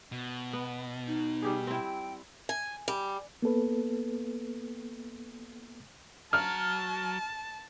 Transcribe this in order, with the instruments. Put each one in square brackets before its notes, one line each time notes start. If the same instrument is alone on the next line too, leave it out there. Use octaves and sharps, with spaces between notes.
[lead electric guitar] B2
[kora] B3
[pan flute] D#4
[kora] G3 G4 G#4
[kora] C4 E4 [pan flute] G5
[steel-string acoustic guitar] G#5
G3
[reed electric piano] A#3 B3 A4 B4
[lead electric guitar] F#3 [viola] A5 [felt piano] F6